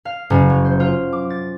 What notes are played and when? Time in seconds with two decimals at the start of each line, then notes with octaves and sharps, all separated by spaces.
0.05 F5
0.30 F#1
0.50 F#3
0.65 C5
0.80 F4
1.13 D6
1.30 A6